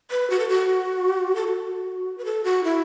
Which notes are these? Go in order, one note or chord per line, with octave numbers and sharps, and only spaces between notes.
B4
F#4
A4
F#4
A4
F#4
B4
A4
F#4
E4